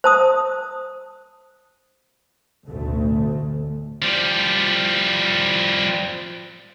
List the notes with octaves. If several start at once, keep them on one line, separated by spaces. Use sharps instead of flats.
C5 A5 D#6
A1 D2 B2 A3
F3 G3